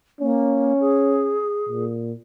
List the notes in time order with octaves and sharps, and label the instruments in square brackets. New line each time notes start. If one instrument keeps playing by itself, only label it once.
[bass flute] A#3 [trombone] C#4
[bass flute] G#4
[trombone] A#2